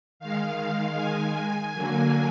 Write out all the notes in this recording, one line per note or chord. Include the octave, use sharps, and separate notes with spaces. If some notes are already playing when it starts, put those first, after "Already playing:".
D#3 G#3 F5
G#5
D3 F#3 A#3